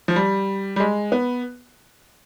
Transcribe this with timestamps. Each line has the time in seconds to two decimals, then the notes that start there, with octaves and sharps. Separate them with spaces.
0.08 F3
0.16 G3
0.76 G3
0.80 G#3
1.12 B3